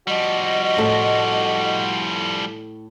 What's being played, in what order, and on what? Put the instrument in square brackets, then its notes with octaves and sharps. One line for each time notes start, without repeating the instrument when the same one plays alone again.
[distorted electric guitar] F3 G3 [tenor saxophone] F#4 [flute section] D#5
[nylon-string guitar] A2 A4